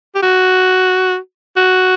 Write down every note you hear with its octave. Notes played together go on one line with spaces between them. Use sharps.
G4
F#4
F#4